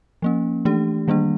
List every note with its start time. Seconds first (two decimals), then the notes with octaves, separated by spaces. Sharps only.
0.22 F3 A#3 C#4
0.65 E3 A3 D4 G4
1.08 D#3 G3 A#3 D4